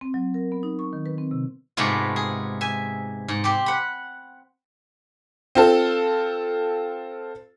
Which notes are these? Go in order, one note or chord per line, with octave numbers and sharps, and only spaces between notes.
C4
F#3
A#4
B3
D#4
C#6
D#3
B4
C4
C3
G#2 C3 G#3 A3 B3 F4
G#4
E5 G#5
G#2
C4 G4
F#5 B5
C4 F4 A4